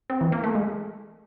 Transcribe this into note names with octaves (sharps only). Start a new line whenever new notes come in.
C4
E3
A#3
A3
G#3